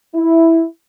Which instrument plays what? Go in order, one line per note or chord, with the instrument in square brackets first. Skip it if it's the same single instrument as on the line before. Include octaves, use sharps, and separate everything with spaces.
[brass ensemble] E4